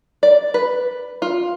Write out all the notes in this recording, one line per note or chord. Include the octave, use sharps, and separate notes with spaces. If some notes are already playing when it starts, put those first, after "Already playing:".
D5
B4
F4